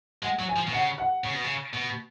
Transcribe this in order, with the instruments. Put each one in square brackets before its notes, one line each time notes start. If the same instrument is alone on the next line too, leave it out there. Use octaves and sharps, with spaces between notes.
[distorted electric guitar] G#3 [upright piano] F#5
[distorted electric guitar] F#3
[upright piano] G#5
[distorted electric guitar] F3
B2
[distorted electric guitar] C#3 [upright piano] F#5
[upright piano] F#5
[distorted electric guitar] C#3
B2
C#3
B2